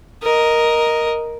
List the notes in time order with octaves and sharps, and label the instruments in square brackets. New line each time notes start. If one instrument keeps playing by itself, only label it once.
[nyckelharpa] A#4 D#5